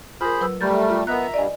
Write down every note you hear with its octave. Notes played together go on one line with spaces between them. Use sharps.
F4 G#4 A#4 C5 B5
F#3 B4 E6
G3 A3 A#4 B5 G6 A6
F4
B3 A#4 D#5 E5 A#5 F#6
G2 D5 D#5 G#5